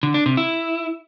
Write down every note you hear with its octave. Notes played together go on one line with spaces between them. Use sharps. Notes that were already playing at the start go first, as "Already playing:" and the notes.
D3
D4
C3
E4